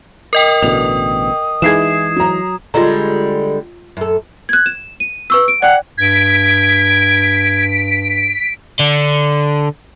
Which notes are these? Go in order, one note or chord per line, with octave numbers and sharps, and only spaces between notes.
A#4 D#5 G5 D#6
A1 B2 D3 F7
E3 G#3 D#4 E4 G#4 G#6 C7 E7
F#3 A#5
D3 G3 G#3 F4 D#5 A#5
F#2 A4
F#6 G#6
E7
D#7
B4 C#6 E6
D7
D5 F#5 G5
G2 G#6 B6 D7
D3